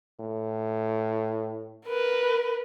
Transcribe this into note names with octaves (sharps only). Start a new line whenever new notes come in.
A2
A#4 B4